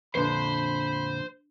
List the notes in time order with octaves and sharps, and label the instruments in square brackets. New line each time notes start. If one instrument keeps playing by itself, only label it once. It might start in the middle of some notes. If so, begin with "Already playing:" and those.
[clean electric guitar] F2 A#2 D3 [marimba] D4 B4 [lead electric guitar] C5 C6 [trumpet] B5